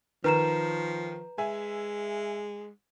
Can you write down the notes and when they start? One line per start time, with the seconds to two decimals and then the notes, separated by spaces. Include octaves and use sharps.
0.24 D#3 F3 B4 A#5 E7
1.38 G#3 E5 G#5